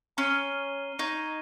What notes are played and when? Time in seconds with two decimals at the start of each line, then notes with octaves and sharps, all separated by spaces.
0.17 C#4 A#5 F6 C7 D#7 G7
0.99 D#4 C#6 G#6 D#7